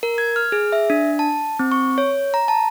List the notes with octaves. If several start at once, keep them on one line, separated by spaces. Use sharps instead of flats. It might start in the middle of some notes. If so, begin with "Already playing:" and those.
A#4
G#6
F6
G#4
E5
D4
A5
C4
C#6
C#5
A#5
A5